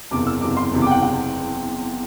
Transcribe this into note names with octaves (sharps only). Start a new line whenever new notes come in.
F#1 E2 C3 D6
E6
F#1 E2 C3 D6
C6
F#1 E2 C3
D6
G5
F#5
C3 F#5